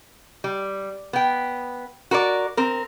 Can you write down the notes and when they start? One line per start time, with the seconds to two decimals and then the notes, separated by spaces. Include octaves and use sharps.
0.44 G3
1.13 B3 G5
2.11 F#4 A#4 B4 D5
2.57 C4 A#4